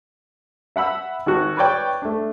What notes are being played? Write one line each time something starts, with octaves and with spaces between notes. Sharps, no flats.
E5 F#5 B5 E6
G#1 F#4
B4 C#5 D5 G5
A3 D4